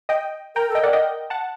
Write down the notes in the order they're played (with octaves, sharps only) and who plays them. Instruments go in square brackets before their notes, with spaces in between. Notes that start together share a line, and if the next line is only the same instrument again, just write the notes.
[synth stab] D#5 G5
[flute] A#4 [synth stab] G5 A#5
[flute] A4
[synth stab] D#5 G5
[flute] A#4 [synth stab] D5 F#5
[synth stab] D#5 G5
F#5 A5